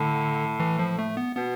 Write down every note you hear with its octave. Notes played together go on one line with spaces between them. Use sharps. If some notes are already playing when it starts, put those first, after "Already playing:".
Already playing: A2 D3
E3
F3
A3
B3
B2 B3